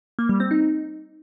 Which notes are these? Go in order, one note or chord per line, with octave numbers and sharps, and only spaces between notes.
A#3
G3
C4
D#4